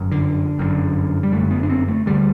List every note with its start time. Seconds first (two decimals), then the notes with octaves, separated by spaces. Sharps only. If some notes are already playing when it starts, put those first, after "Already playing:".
Already playing: G1 F#2
0.12 D3
0.59 G1 F#2 D3
1.23 G3
1.32 G1 F#2 D3 A3
1.51 B3
1.63 D4
1.70 C4
1.88 A3
2.06 D2 D3 G3